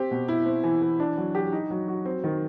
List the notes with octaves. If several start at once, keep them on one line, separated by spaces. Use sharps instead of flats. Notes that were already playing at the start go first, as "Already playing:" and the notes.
Already playing: C4 G4
B2
E4
C4
E3
E3
D4
F#3
G4
D#4
F#3
F#4
C4
D#3